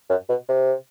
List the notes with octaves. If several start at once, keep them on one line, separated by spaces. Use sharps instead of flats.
F#2
B2
C3